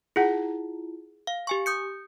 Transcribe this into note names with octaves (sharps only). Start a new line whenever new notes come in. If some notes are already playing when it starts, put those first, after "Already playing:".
E4 F4 G#4 F#5
F5
G4 G#5 C#6
D#6 G6 C#7